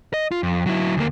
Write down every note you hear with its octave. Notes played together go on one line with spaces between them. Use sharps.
D#5
F4
F2
F#3 E4
D2 A#3